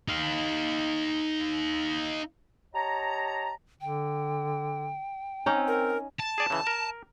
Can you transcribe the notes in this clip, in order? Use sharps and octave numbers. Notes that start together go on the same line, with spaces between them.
D#4 F5
G4 C#5 D#5 A5 A#5
D3 G5
C4 C#4 D#4
A#4
A5
G#4 D5 G#5
C#3 E3
A#4